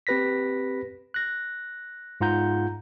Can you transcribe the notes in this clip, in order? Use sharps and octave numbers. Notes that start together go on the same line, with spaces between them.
C4 G4 B4 A#6 B6
F#6 A#6
G#2 F4 F#5 A#5 G6